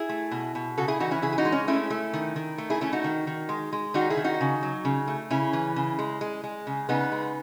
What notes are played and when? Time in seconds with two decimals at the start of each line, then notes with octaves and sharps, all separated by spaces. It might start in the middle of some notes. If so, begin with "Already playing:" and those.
Already playing: E4 G#4
0.09 A3
0.31 B2
0.55 B2
0.77 C#3 F#4 A4
0.88 E4 G#4
1.00 E3 D#4 F#4
1.11 C#4 E4
1.22 C#3 E4 G#4
1.32 G#4
1.38 D#4 F#4
1.45 G#3
1.52 C#4
1.68 A3 C#4 E4
1.90 A3
2.13 D#3
2.36 D#3
2.58 A3
2.70 E4 G#4
2.81 A3 C#4 E4
2.93 D#4 F#4
3.04 D#3
3.27 D#3
3.49 G#3
3.73 G#3
3.94 D#3 D#4 F#4
4.10 E4 G#4
4.17 D#3
4.24 D#4 F#4
4.41 C#3
4.63 F#3
4.85 C#3
5.07 A3
5.30 C#3 C#4 E4
5.53 E3
5.76 C#3
5.99 G#3
6.21 G#3
6.44 G#3
6.67 C#3
6.89 C#3 B3 D#4
7.12 G#3